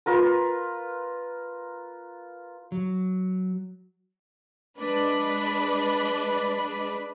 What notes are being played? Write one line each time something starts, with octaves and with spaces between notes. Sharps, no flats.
F4 A#4 B4
F#3
G#3 D4 B4 B5